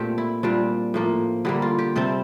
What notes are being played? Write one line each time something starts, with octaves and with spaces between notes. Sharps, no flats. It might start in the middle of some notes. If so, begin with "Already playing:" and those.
Already playing: A#2 A3 C4 G4
E4
A#2 G3 C4 D4
A2 F3 A#3
D3 G3 A#3 E4
F4
G4
C3 G3 C4 A4